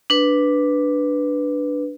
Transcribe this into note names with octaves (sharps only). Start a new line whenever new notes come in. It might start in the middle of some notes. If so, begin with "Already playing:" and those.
D4 B4